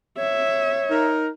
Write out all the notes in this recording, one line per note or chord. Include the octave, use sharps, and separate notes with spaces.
C#5 E5
D#4 A#4